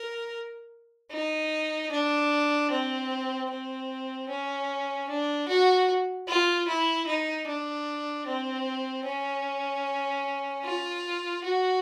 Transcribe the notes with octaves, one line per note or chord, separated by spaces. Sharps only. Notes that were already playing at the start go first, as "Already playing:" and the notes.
Already playing: A#4
D#4
D4
C4
C4
C#4
D4
F#4
F4
E4
D#4
D4
C4
C#4
F4
F#4